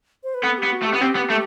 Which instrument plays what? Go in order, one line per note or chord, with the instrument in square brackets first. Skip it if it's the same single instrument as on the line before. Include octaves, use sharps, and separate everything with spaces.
[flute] C5
B4
[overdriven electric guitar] B3 [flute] A4
[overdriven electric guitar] B3 [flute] G4
[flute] F#4
[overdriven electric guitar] A3
[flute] G4
[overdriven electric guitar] B3
[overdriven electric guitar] C4 [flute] G4
[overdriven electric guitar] B3
A3